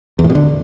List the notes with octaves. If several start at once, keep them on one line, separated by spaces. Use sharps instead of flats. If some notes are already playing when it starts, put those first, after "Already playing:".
E2
A2
B2
D3